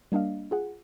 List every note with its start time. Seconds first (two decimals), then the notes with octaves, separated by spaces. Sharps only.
0.12 G3 A#3 D4 D#5 F5
0.51 F4 G#4 F#5